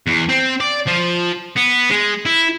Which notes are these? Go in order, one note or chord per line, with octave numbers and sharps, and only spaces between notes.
E2
C4
D5
F3
B3
G#3
E4